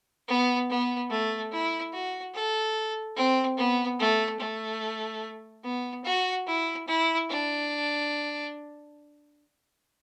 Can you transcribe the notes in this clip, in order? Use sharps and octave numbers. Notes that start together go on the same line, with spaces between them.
B3
B3
A3
E4
F#4
A4
C4
B3
A3
A3
B3
F#4
E4
E4
D4